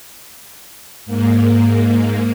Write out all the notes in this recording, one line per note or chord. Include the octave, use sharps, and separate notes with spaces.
G#2 A#3